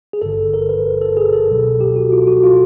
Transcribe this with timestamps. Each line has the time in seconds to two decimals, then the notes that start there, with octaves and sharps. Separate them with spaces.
0.13 G#4
0.22 G#1 G2 D3 A4
0.54 A#4
0.69 B4
1.02 A4
1.17 G#4
1.33 A4
1.48 C#2 B2 F#3
1.81 G4
1.96 F#4
2.12 F4
2.27 F#4
2.43 F4